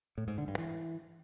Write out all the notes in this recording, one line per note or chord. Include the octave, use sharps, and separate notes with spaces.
A2
G#2
D3
G2
E3